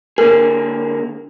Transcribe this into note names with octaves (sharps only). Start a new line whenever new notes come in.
D3 A#3 G#4 A#4